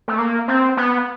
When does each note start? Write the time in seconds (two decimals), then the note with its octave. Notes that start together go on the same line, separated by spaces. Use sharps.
0.08 A3
0.18 A#3
0.48 C4
0.77 B3